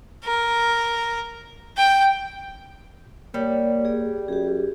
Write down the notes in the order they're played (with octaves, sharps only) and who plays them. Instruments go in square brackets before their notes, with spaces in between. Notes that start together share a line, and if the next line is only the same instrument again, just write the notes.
[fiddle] A#4
G5
[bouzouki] G3 [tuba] A#3 [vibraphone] C#5
[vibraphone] G#4 D5
[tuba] F#2 [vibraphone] G4 G#4